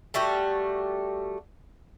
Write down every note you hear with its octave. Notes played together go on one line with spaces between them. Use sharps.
G3 A3 F#4 G4